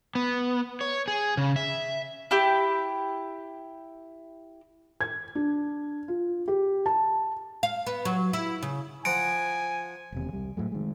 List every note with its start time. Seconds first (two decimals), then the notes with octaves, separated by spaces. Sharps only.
0.15 B3
0.81 C#5
1.08 G#4
1.37 C#3
1.56 E5
2.31 E4 G4
5.01 G#6
5.35 D4
6.08 F4
6.48 G4
6.86 A5
7.63 F5
7.86 B3
8.05 F#3
8.33 E4
8.62 C#3
9.05 F3 F#5 G#5 A#5 D7
10.12 E1 D#2 C3
10.33 C2 G3
10.57 A2 C3 F#3 A3
10.72 D#3 G#3